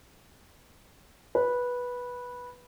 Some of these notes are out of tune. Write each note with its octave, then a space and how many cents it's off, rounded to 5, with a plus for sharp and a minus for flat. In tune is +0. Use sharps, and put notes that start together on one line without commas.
B4 -10